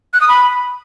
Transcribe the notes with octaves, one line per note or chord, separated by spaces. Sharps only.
F#6
D#6
B5